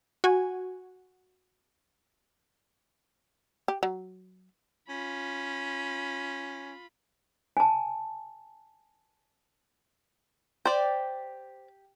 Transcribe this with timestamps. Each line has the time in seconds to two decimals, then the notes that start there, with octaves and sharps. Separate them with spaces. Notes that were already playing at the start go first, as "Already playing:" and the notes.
0.24 F#4 G#5
3.68 G4
3.83 F#3
4.89 C#4 F4 B5
7.57 G#5 A5
10.65 G4 C5 D5